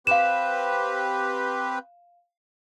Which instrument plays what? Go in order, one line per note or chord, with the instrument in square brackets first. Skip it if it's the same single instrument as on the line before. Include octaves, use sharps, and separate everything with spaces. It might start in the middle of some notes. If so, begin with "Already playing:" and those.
[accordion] C4 G4 B4 [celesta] F5 E7